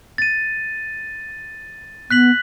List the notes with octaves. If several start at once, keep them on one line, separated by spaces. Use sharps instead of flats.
A6 D#7
B3 F#6 B6 F#7